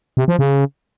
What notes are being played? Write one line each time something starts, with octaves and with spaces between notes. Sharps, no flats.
C3
F3
C#3